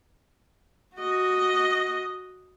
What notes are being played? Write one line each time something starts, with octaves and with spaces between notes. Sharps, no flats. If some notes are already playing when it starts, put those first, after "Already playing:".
F#4 D#5